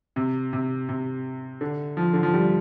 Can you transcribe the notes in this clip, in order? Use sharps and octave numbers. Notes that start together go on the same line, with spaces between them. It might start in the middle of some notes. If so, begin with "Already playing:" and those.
C3
C3
C3
D3
F3
D3
F3
G3